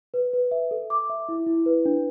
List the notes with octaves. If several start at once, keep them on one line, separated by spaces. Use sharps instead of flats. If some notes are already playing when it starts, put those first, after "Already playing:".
B4
B4
E5
A4
D6
E5
E4
E4
B4
D4